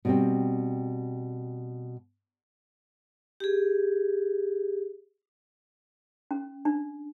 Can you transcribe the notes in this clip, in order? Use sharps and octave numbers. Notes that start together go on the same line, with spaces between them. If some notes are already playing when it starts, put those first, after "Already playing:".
B2 G3 C4
G4 G#4
C#4
D4